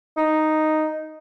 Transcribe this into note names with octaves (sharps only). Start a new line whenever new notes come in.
D#4